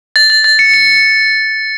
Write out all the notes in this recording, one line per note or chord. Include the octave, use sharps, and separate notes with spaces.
A6
A6
A6
C#7
C#7